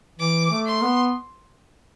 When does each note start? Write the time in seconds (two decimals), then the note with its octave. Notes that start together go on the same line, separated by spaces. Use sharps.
0.19 E3 D6
0.51 A3
0.66 C6
0.82 B3